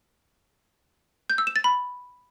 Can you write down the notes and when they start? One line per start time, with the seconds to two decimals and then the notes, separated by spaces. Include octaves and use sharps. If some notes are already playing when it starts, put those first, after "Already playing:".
1.30 G6
1.38 E6
1.47 E7
1.56 A6
1.64 B5